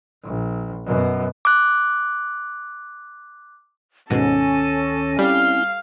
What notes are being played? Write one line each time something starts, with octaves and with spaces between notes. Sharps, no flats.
A#1
F#2 B2
D6 F#6
D2 G#2 B2 D#3 C#4 A4
G3 C4 E4 F5